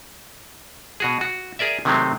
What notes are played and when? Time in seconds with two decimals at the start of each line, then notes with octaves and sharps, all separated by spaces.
1.00 B2 F#4 G#4
1.21 F#4
1.59 G#4 A#4 D5 E5
1.85 C3 D#3 F#3 G#3 A3 C4